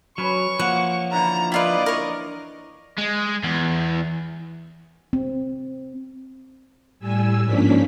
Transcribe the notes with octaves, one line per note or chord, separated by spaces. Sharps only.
F#3 C#4 B4 C#5 C#6
F3 A#3 F#5
D3 E3 A#5
E4 F4 B4 D5 D#5
A#4 C#5 C#6
G#3
E2
C4
A2 G3 G#5 E6
G#2 F3 A#3 C#4 D4 B6